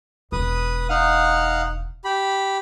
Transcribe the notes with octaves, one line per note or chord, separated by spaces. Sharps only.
E1 B4 D#6
D#4 F5 F#5
G4 B5